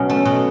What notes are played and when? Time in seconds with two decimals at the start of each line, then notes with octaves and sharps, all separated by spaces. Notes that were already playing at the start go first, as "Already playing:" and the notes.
Already playing: B2 F#3 C#4
0.10 A3
0.25 B2